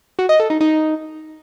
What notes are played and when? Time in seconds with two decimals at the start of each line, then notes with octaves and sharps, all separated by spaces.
0.19 F#4
0.29 D#5
0.40 A4
0.50 D#4
0.61 D#4